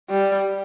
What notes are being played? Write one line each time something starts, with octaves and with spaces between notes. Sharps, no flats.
G3